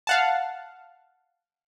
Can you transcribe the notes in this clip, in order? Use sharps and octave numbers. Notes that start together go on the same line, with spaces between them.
F5 F#5 A5